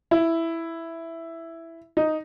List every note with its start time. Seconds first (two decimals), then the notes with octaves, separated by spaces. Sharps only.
0.11 E4
1.97 D#4